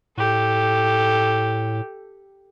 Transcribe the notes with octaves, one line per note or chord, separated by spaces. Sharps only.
A2 G4 A4